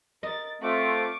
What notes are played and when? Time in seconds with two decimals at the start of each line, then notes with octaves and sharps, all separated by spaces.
0.23 A#4 D#5 A6
0.61 A3 C4 F4 C#6 D6